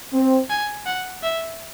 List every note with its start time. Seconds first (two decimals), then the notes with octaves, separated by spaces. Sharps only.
0.14 C4
0.50 G#5
0.86 F#5
1.23 E5